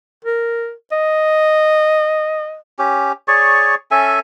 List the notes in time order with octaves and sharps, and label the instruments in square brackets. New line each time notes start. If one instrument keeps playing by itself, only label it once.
[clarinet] A#4
D#5
[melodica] C#4 G4
G#4 C#5 D5 C#6
C#4 A4 E5 G#5